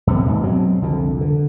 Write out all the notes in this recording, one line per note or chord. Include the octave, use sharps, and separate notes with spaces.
F2 C3 B3
D#1 G#2
B2 F#3 C4
C2 F2 D3
D3